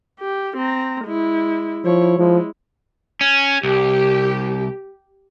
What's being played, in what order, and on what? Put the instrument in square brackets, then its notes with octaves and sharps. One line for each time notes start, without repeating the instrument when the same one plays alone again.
[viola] G4
C4 A#5
G#3 E4
[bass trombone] F3 [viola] E4 C#5
[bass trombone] F3 [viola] G#3 E4
[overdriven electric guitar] C#4
[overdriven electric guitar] C2 [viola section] G4